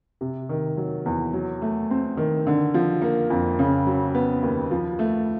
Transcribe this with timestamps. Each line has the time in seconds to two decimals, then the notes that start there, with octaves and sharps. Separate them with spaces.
0.21 C3
0.49 D#3
0.77 F#3
1.06 E2
1.33 F#3
1.62 A3
1.90 C4
2.17 D#3
2.47 D3
2.74 F3
3.02 A#3
3.30 F2
3.59 C#3
3.86 F#3
4.15 B3
4.43 D#2
4.71 F3
4.99 A3